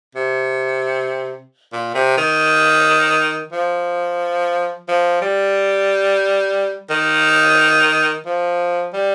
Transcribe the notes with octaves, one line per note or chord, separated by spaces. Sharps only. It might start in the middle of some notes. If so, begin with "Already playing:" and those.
C3
A#2
C3
D#3
F3
F3
G3
D#3
F3
G3